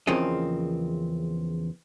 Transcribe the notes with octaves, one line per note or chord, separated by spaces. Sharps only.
E2 C#3 F3 A#3 C4 D#5